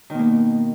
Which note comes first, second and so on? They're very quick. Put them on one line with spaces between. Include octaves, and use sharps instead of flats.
D#3 B2 A#3